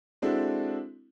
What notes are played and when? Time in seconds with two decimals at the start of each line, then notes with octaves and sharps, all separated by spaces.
0.22 G#3 C4 D4 E4 F#4 A4